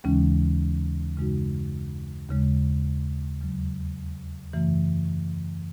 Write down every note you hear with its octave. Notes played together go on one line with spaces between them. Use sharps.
D#2 C#3 E3 G#3 C#4
F#2 C#3 G#3 D#4 F#4
D#2 C#3 G#3
E2 C#3 F#3
F#2 C#3 E3 A3